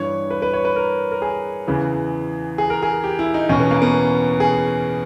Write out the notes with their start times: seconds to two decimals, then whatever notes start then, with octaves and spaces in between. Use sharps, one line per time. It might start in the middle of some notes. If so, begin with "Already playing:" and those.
Already playing: G2 E3 C#5
0.30 B4
0.42 B4
0.53 C#5
0.65 B4
0.76 A#4
1.12 A#4
1.22 G#4
1.68 E2 C#3 E3
2.58 G#4
2.70 A#4
2.83 G#4
3.04 G4
3.19 E4
3.34 D#4
3.49 E2 B2 C#4
3.60 B3
3.71 A#3
3.82 B3
4.40 G#4